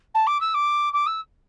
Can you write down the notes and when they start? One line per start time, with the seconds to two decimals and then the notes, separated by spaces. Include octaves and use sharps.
0.14 A5
0.26 D6
0.40 E6
0.54 D6
0.93 D6
1.06 E6